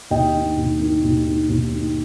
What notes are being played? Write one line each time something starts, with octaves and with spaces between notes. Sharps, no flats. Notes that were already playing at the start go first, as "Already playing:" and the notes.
D#2 D#5 G5
D#3
D#2
D#3
D#2
D#3
D#2
D#3